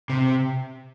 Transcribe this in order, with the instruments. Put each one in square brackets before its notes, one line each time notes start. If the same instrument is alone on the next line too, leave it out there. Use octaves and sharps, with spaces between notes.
[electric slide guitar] C3